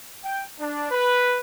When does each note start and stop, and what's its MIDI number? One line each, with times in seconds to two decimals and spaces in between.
0.24 0.47 79
0.59 0.88 62
0.91 1.39 71